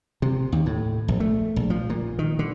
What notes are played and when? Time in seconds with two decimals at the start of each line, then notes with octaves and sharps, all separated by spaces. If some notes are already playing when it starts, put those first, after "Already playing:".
0.22 C3
0.52 D#2
0.66 A2
1.08 A#1
1.20 A3
1.56 A#1
1.70 F3
1.90 A#2
2.19 D#3
2.39 D3